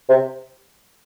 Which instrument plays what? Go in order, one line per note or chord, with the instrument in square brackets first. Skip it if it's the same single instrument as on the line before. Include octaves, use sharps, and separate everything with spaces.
[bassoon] C3